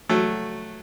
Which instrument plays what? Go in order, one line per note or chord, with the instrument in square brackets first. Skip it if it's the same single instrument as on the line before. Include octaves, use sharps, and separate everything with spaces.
[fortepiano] F#3 A3